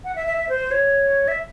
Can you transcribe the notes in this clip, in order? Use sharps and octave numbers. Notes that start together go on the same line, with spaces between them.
F#5
E5
E5
E5
C5
C#5
E5